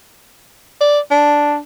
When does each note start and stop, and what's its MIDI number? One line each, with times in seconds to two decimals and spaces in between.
0.81 1.00 74
1.11 1.59 62